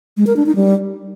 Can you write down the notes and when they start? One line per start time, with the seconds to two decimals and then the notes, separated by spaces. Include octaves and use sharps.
0.17 G#3
0.27 A#4
0.36 D4
0.46 D#4
0.56 G3